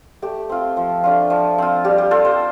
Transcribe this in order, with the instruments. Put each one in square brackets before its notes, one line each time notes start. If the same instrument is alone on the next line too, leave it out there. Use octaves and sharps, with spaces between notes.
[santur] A3 G4
C4 F4
F3
A3 D4 F4
F3
C4 F4
G3 G4
G4
F4 A4
C5